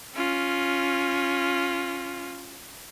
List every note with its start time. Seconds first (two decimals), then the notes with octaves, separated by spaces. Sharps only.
0.14 C#4 F4